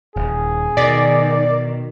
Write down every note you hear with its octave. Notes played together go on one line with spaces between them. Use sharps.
D#1 G#4
B2 D#3 D5